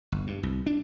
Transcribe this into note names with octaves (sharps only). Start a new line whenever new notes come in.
G1
G2
C2
D4